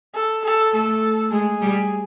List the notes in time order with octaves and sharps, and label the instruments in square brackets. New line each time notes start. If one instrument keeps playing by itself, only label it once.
[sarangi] A4
A4
[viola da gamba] A3 [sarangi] A4
[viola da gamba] G#3 [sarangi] G#4
[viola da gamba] G3